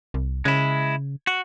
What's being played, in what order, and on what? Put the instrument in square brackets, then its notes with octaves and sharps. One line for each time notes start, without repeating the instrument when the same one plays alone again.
[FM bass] C2
[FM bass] C#3 [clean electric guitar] G#3 E4
[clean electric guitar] F#4